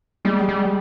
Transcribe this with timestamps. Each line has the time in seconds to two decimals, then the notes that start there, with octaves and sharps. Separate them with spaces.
0.25 G3 G#3
0.49 G3